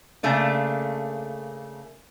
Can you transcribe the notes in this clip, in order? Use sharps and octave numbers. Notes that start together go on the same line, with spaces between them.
C#3 A3 A#3 D4